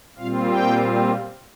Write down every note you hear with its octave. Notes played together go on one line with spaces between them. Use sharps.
A#2 G3 C4 F4 F5
G5